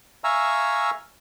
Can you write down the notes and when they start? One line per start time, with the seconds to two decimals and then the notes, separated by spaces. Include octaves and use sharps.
0.24 E5 F5 G#5 A#5 C#6 E6